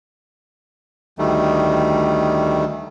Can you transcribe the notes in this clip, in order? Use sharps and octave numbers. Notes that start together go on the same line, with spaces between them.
D2 D#3 G3 A3